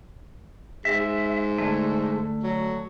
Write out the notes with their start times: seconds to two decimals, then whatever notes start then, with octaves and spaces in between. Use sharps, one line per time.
0.85 G#2 E5
1.58 D3 A3
2.43 F#3